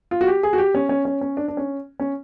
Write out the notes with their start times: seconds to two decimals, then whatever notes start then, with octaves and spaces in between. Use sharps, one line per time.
0.11 F4
0.21 F#4
0.27 G4
0.43 G#4
0.53 F#4
0.58 G4
0.75 C#4
0.89 C#4
1.05 C#4
1.21 C#4
1.37 D4
1.48 D4
1.57 C#4
2.00 C#4